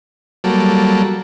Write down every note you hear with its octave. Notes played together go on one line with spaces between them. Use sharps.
F#3 G3 A#3 A4